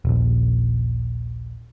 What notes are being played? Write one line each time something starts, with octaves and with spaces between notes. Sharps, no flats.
D#1 A#1